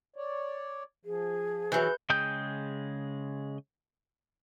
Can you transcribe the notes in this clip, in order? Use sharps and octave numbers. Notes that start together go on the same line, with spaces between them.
C#5 D5
F3 G#4
E3 F#3 B4 G6
C#3 G#3 G5 D#6 G6